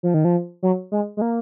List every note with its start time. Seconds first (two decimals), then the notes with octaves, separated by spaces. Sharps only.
0.03 F3
0.14 D#3
0.25 F3
0.63 F#3
0.92 G#3
1.17 G#3
1.22 A#3